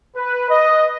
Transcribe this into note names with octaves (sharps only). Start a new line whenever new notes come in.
B4
D#5